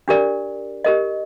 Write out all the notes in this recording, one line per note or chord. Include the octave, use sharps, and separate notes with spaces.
D4 G4 A#4 D5
G4 A#4 D#5